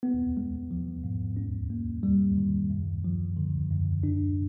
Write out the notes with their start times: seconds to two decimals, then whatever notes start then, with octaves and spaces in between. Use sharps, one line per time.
0.03 B3
0.37 G#3
0.71 F3
1.04 G#2
1.37 C#4
1.70 A#3
2.03 G3
2.38 D#3
2.70 F#2
3.04 F3
3.37 D3
3.71 F#2
4.03 D4